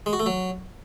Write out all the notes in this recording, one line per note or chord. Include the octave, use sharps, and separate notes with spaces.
G#3
F#4
A3
F#3